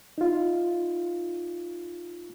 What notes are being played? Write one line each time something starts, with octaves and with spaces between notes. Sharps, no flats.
D#4 F4